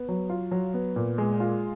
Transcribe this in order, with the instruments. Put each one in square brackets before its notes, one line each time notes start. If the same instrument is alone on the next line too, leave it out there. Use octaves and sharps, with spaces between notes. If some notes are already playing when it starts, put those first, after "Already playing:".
Already playing: [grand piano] B3
F#3
F4
F#3
B3
A#2
G#3
F4